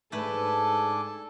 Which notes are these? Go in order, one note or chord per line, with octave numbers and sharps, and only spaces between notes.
G#2 A3 D4 A4 B4 G#5 D6